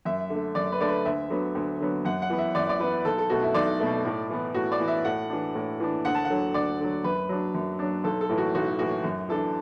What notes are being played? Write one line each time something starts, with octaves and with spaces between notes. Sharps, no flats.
F#2 E5
D3 A3
F#2 D5
B4
D3 A3 D5
B4
D2 E5
D3 F#3 B3
D2
D3 F#3 B3
F#2 F#5
F#5
E3 B3
E5
F#2 D5
D5
E3 B3 B4
B1 A4
A4
B2 A3 F#4
E4
B1 D5
B2 A3
A2
E3 B3
A2 F#4
D5
E3 B3
E5
A2 F#5
E3 D4
A2
E3 D4
D2 F#5
A5
F#5
D3 F#3
D2 D5
D3 F#3
F#2 B4
F#3 D4
F#2
F#3 D4
B1 A4
A4
A2 E3
F#4
B1 F#4
A2 E3 F#4
F#2
E3 D4 A4